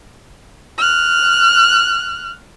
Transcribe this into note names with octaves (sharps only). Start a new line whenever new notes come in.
F6 F#6